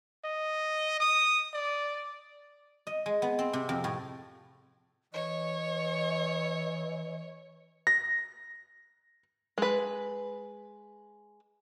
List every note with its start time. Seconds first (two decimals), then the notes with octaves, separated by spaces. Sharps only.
0.24 D#5
1.00 D#6
1.54 D5
2.87 D#5
3.06 G#3
3.22 B3
3.39 C4
3.53 C3
3.69 F2
3.84 A2
5.14 E3 C#5 D#5
7.87 A#6
9.58 G#3 B4